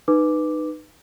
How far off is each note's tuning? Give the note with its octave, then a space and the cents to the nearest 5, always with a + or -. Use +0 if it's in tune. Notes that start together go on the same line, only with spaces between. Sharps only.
D#4 -20 B4 +0 D6 +0